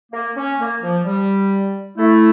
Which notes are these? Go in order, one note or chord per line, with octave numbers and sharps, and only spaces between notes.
A#3
C#4
A#3
F3
G3
A3 E4